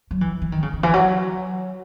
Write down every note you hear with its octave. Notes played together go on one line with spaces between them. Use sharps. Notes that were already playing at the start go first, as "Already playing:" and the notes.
F#3
E3
E3
D#3
C#3
C#3
E3
F#3